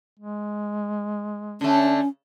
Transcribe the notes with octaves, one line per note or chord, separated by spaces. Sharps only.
G#3
D3 A3 C#4